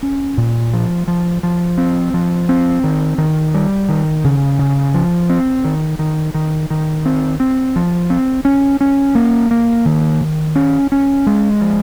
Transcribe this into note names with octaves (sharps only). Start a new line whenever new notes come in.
C#4
A#2
F3
F3
F3
C4
F3
C4
D#3
D#3
G3
D#3
C#3
C#3
F3
C4
D#3
D#3
D#3
D#3
C4
C4
F3
C4
C#4
C#4
A#3
A#3
D#3
D#3
C#4
C#4
G#3
F3